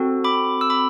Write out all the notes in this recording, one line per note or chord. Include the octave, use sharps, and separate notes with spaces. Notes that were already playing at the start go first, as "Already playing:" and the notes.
Already playing: C4 F#4 A4
B5 D6
E6
B5 D6